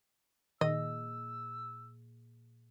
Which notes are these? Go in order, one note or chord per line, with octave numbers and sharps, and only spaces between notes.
A#2 D#3 G#4 D#5 E6